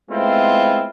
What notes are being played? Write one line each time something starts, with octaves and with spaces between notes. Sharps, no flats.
G#3 A3 B3 C4 E4 F4